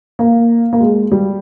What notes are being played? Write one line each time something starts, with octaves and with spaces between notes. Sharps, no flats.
A#3
A#3
G#3
G3